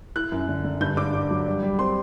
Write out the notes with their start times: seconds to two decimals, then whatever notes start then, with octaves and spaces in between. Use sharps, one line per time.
0.16 E4 F#6
0.32 F#2
0.48 D3
0.64 D3
0.80 G2 G6
0.97 D4 D6
1.14 D4
1.30 F#3
1.46 G3
1.63 G3
1.79 C4 C6